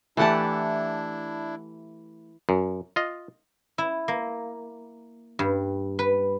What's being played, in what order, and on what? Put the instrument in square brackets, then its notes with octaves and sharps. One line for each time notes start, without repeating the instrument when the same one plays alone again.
[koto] E3 F#5 A5 [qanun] A3 G4 [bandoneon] D4 E4
[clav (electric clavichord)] F#2
F4 D#5
[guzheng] E4
A#3
G2
B4